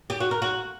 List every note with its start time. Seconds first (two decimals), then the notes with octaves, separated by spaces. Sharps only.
0.10 G4
0.20 F#4
0.31 A#4
0.42 F#4